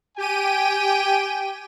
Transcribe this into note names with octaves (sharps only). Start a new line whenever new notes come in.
G4 G5 G#5 D#7